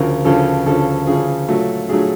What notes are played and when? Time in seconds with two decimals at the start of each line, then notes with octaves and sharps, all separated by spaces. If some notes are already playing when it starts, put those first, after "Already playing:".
Already playing: D2 C#3 F3 A#4
0.24 D2 C#3 F3 A4
0.66 D2 C#3 F3 A4
1.07 D2 C#3 F3 G#4
1.48 A#2 F#3 A3
1.89 A#2 F#3 A3 G#4